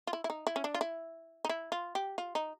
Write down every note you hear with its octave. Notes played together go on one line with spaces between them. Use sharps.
F4
E4
E4
D#4
E4
C#4
D4
F4
E4
D#4
E4
F4
G4
F4
D#4